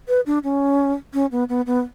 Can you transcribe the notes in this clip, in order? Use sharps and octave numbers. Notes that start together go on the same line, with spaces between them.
B4
D4
C#4
C#4
B3
B3
B3